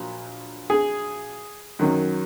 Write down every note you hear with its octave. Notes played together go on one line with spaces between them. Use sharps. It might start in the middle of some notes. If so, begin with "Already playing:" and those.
Already playing: A#1 A#2 F#3
G#4
F#2 D#3 F#3